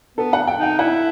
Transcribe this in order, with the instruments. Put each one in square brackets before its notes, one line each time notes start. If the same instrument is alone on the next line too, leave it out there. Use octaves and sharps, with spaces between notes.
[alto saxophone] B3 [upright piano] A4
[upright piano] F#5
G5
[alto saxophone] D#4 [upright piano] G5
[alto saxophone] E4 [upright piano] F#5